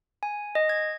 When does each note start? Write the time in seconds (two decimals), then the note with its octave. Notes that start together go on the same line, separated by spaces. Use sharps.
0.23 G#5
0.55 D#5
0.69 G#6